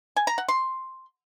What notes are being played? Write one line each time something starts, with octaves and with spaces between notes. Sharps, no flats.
G#5
A#5
F#5
C6